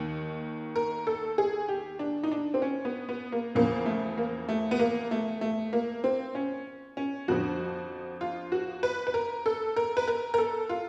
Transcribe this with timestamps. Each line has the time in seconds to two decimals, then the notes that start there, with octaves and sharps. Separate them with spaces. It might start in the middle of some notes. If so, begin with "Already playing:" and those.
Already playing: D#2 D#3
0.76 A#4
1.07 A4
1.38 G#4
1.68 G4
1.99 D4
2.23 D#4
2.32 D4
2.54 C4
2.62 C#4
2.85 B3
3.09 B3
3.32 A#3
3.55 E2 C#3 F3 A#3
3.86 A3
4.18 A#3
4.49 A3
4.71 B3
4.79 A#3
5.11 A3
5.41 A3
5.73 A#3
6.04 C4
6.35 C#4
6.97 C#4
7.28 F2 D3 F3 F#4
8.21 F4
8.52 F#4
8.83 B4
9.07 B4
9.14 A#4
9.46 A4
9.76 A#4
9.97 B4
10.08 A#4
10.34 A#4
10.38 A4
10.69 F4